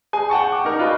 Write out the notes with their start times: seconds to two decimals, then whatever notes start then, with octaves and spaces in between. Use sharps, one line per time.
0.13 G#4 G#5
0.30 F#5 G5 A5 C#6
0.52 D6
0.65 D#4 A#4
0.79 F4 F#4 B4 D#5